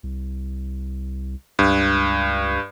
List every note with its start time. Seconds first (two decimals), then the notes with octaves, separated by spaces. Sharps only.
0.03 C2
1.59 C#2 G2